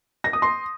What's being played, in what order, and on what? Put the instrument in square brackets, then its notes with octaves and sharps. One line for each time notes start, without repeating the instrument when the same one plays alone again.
[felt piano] A#6
D#6
C6